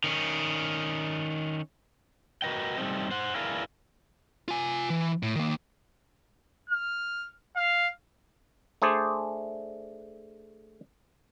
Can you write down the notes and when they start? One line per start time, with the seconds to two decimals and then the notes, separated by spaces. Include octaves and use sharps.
0.04 D#3 C#4
2.42 F#4 A#4 B4 D#5 G5
2.78 G3 A3 C4 D#4
3.11 C5 F#5
3.35 E4 G#4 A#4 B4 D5 F5
4.48 F4 G#5
4.90 E3
5.23 A2
5.36 D#3 A#3
6.70 F6
7.56 F5
8.82 A3 D4 G#4 C5 D5